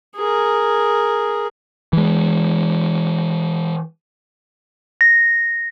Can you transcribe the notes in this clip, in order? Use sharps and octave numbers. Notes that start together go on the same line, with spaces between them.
G#4 A#4
E3 G#3
A#6